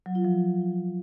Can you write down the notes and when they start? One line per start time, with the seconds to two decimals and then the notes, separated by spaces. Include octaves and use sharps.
0.06 F#3
0.15 F4
0.25 F3